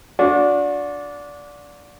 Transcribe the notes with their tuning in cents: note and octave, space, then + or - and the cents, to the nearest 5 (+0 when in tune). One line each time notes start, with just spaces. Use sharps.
D4 -15 F#4 -40